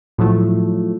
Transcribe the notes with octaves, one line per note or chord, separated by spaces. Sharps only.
A2 F3 F#3 A3